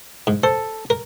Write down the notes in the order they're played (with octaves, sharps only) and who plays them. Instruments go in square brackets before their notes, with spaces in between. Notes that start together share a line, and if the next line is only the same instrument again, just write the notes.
[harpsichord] G#2
[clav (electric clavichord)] A4 [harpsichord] C5
[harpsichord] A#4